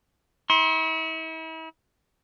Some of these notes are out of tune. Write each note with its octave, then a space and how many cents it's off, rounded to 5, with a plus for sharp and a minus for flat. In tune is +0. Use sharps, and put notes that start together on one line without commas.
E4 -40 C6 +30